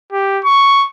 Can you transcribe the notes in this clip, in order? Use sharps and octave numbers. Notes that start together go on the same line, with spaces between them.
G4
C#6